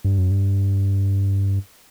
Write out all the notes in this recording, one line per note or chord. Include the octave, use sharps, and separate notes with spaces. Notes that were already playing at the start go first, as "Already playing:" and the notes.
G2
F#2
G2